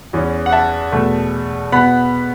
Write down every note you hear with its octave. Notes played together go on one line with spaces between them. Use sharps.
E2 E3 C#4
F#5
E5 A5
E2 B2 A3
B2 B3 F#5 B5